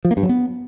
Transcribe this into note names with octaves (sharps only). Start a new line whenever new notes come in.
F3
A#3
G2
F#3
B3